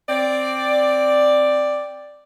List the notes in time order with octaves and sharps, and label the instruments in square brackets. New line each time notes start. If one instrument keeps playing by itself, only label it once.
[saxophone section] C4 D5